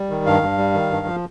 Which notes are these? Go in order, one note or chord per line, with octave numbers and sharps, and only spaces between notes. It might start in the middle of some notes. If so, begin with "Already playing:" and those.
Already playing: G3
D#3
G2 F5
G2
G3
D#3
G2
F3